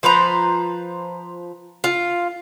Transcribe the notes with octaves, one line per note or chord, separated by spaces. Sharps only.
F3 B4 C5 A#5
F4